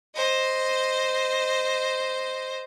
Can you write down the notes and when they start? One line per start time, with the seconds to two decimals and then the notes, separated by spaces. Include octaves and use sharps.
0.15 C5 D#5